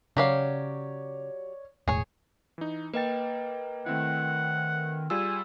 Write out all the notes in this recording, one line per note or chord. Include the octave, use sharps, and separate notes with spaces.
C#3 F#3 G4 C#5 D5 F5
E1 A2 G#4 C#5
E3 D#4
A#3 B4 D#5 G5 A6
D#3 A3 C4 E4 F#5
G3 F4 G#4 G#5 E6